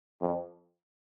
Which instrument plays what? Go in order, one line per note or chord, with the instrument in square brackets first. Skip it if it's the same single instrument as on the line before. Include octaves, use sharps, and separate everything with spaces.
[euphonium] F2